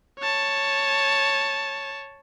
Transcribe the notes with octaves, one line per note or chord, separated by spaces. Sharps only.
C#5 A5